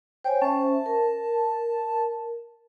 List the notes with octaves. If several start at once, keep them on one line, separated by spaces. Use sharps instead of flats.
C5 C#5 G5 G#5
C#4 C5 E5 A5
A#4